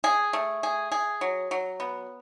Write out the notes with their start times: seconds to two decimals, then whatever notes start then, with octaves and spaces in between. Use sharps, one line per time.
0.04 G#4
0.33 A3
0.63 G#4
0.92 G#4
1.21 F#3
1.51 F#3
1.80 B3